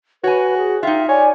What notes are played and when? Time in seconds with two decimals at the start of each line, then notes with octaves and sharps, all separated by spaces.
0.24 F#4 B4 C#5 G#5
0.57 G#4
0.83 D#4 F4 E5 G5
1.09 C#5 D5 G#5